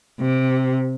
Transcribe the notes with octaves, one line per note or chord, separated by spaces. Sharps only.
C3